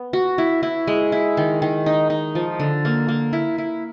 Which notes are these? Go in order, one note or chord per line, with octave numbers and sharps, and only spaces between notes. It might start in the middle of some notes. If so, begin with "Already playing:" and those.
Already playing: B3
F#4
E4
E4
G#3
E4
D#3
D#3
D#4
D#4
F3
D3
A#3
A#3
E4
E4